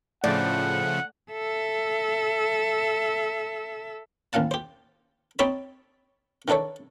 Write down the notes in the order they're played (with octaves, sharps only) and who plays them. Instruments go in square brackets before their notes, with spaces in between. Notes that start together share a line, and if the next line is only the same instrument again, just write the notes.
[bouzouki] A2 [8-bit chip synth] C#3 F3 A3 [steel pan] D5 [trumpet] F#5
[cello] A4 E5
[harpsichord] A1 D#2 F5 F#5 A5
G4 C5
C4 D#4 G4 C#5 A5 B5
D#3 E3 D4 A4 C#5